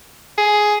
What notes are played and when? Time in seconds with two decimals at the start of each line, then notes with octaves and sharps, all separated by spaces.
0.38 G#4